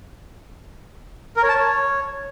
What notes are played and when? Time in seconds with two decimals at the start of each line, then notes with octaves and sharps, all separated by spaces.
1.37 A#4
1.43 C#5
1.49 A5
1.55 C#5